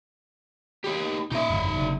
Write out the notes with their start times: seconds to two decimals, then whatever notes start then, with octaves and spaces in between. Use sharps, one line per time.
0.85 D#4 G4
1.32 A#2 D#4 E5
1.50 G1 F2
1.76 F#1 C3